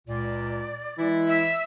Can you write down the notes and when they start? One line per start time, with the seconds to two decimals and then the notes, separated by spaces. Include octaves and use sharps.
0.08 C#2 A#2 D5
0.98 E3 G#3 E4
1.27 E5